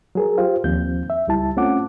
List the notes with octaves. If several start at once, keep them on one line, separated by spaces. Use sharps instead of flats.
F#3 G#4 A#4
F4 G4 C5 F5
D#2 F3 C4 G6
E5
C#2 G3 E4 A5
A3 C4 C#4 F4 F#5 D6